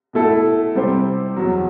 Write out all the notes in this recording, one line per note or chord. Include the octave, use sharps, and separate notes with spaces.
B2 A3 E4 A4
C3 G3 C4 G4 C5
E2 B2 F#3